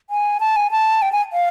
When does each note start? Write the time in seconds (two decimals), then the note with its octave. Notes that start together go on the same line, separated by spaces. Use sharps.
0.10 G#5
0.40 A5
0.56 G#5
0.71 A5
1.02 G5
1.12 G#5
1.33 F5